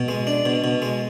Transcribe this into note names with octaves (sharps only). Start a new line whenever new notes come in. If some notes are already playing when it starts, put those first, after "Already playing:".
Already playing: B2
G#3
D4
B2
B2
G#3